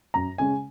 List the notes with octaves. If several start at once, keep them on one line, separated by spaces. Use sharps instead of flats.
F#2 A#5
C#3 G#3 C#4 G#5